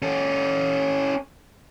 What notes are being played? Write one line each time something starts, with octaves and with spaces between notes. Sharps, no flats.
C#4 A4